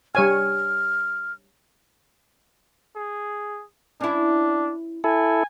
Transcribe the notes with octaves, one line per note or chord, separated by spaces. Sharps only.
G3 C#5 G#5 F6
G#4
C#4 D4 E4
E4 A4 G#5